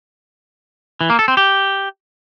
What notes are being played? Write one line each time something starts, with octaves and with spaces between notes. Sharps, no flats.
E3
A#3
A4
C4
G4